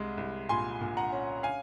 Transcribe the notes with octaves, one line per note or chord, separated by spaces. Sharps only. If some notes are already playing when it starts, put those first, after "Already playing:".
Already playing: C2 G#3
C2
A#2 G#5 C6
A#2
F#5 A#5
C#4
F5 G#5